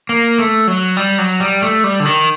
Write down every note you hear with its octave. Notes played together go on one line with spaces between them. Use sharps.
A#3
A3
F#3
G3
F#3
G3
A3
G3
D3
D#3